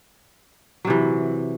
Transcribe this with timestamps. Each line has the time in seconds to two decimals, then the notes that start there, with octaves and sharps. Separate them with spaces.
0.85 F#3
0.87 C3
0.90 E3